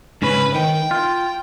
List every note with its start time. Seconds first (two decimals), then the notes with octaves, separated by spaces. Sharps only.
0.22 G#2 C#3 C#4 B4
0.55 D#3 G5
0.91 F4